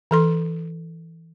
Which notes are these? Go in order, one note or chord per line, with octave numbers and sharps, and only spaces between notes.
E3 A4 C6